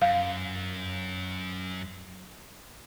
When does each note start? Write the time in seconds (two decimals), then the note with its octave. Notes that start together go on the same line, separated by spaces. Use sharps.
0.02 F#2 F5